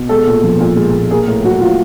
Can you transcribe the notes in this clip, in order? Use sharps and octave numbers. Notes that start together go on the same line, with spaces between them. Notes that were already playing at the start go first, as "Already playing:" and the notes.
Already playing: B2
G#3 A4
A#2
F3
A#2
G#3
A#2
A#3 G#4
A2
F#3 F#4
A2 F4